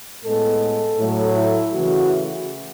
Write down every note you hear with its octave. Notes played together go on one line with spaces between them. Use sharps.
A2 G#3 B3 A4
A2 F#3 A3
E4
C#3 E3 A3 F#4